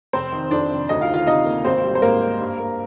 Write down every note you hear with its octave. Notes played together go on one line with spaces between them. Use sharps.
F1 C4 C5
D#3
F2 D4 D5
F1
D2 D#4 D#5
F4 F5
D#3
F4 F5
C3 D#4 D#5
A#3
G#1 C4 C5
G3
C5
G#2 A#3 A#4
C4
G2
A#3